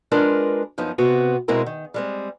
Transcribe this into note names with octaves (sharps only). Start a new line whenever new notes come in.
G#3 D4 F4 A#4 B4
F#2 F3 B3 D#4
C3 B3 C4 F#4
B2 G#3 C4 E4 A#4
D#3
G3 G#3 C4